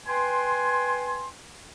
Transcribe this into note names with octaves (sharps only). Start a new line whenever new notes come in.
B4 G5 G#5 C6